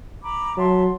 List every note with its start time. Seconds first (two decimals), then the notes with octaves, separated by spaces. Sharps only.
0.24 A#5 B5 D6
0.57 F#3 E5 A5 C6